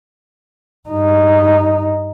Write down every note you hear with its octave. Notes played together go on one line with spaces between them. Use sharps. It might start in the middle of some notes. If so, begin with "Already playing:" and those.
G2 D#4